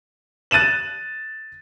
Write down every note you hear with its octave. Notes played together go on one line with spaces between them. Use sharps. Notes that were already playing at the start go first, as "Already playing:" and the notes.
F#6 A6 D#7 E7 F#7